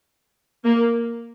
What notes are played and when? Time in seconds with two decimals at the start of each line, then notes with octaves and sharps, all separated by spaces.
0.65 A#3